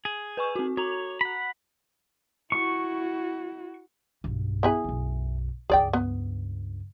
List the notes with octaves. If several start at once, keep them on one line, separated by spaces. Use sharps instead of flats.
G#4
B4 G#5 C#6
C4 F#4
F#4 C#5 A#5 F7
F#5 B5
E4 F#4 C#6
B1 G2
B3 E4 G#4
B1 F#2
C#2 G2 G#4 D5 G5
B3